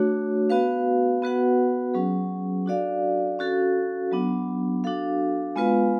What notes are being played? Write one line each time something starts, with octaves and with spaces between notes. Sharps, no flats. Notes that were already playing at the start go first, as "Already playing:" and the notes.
Already playing: A3 D4 F#4 C#5
B3 F#4 B4 F5
B3 F#4 B4 F#5
F#3 C#4 G#4
D4 F#4 A4 D5 F5
C#4 F#4 A4 F5
F#3 B3 D4
D4 F#4 A4 F5
G#3 B3 F4 B4 F5